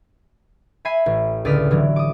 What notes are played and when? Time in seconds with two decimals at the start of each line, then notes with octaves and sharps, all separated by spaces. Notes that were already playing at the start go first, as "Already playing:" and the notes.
0.85 E5 G#5 B5 G#6 C7 D#7
1.06 A1
1.45 C#2 D3 D5 D#6 F6 B6
1.71 D3 E3 F#3
1.96 D6 D#6